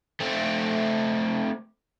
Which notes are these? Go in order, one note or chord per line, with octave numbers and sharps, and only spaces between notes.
A3 C4